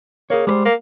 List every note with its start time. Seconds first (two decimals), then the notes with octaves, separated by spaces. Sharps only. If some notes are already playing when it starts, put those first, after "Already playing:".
0.30 A#3 G#4 C#5
0.47 G3 G#3 B4 C5
0.65 A#3